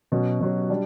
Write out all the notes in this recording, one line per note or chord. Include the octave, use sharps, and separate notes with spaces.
B2 F#3 C#4 F#4
B2 F#3 C#4 F#4
G3 D4